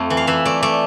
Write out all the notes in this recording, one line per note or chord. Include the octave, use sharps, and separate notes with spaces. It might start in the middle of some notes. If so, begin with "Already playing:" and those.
Already playing: F2 A3
E3
F5
E3 E5
A3 D5
A3 D5